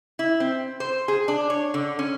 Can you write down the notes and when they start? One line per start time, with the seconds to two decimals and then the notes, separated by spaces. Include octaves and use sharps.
0.19 E4
0.40 C4
0.80 C5
1.08 G#4
1.28 D4
1.50 C#5
1.74 D3
1.99 C#4